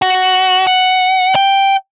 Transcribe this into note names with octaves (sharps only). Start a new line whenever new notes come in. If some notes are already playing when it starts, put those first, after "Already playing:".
F#4
F#5
G5